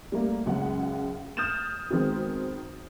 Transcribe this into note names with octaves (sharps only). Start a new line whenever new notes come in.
G3 A3 A#3
C#2 F#2 C#3 G#3 F#5
D#6 F6 G6 A6 E7
D#3 G#3 B3 C4 F#4